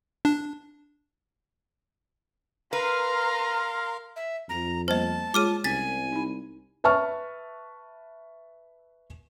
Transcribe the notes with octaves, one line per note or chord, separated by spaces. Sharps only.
D4
A#4 B4 F5 A#5 C6
E5
F2 A#5
G3 A#3 B3 C5 D#5 A5
G#3 F4 G#4 C#5 D6 F6 D#7
C2 C#4 G#5 A6 B6
D#4 B5
B4 E5 A5 C#6 F6